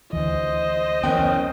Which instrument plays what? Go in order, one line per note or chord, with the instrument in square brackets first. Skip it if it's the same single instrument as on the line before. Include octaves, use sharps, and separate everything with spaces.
[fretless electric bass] D2 E3 [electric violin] C5 D#5
[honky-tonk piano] F#1 G5 [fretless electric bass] E3 B3 [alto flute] C#4